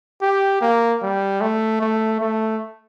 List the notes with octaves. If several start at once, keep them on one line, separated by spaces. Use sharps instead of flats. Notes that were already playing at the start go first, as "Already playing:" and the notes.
G4
A#3
G3
A3
A3
A3